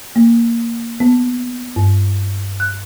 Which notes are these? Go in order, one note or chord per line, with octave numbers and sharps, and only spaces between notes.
A#3
B3
G2
F#6